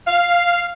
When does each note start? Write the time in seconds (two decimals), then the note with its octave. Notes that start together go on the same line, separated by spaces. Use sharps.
0.07 F5